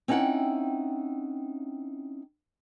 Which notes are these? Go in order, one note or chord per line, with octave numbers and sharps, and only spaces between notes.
C4 C#4 D#4 E4 F#5 G5